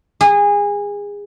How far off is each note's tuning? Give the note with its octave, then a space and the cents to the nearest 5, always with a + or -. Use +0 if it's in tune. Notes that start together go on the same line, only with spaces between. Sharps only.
G#4 -25